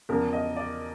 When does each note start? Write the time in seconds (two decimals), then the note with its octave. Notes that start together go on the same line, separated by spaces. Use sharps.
0.09 E2 C#3 F3 A#4
0.33 D#5
0.57 D5